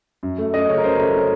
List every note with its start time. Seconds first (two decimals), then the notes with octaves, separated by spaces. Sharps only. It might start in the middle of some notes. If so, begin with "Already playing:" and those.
0.23 F#2
0.38 A3
0.54 C#4 D#5
0.69 C#3 C#5
0.78 A#4
0.84 F#2 C5
0.94 A#4
0.99 A3 C#5
1.14 C#4